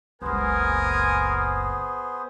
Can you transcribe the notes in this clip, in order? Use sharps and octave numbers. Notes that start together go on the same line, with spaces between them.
F#1 C#2 B3 G#4 A#4 C5 G#5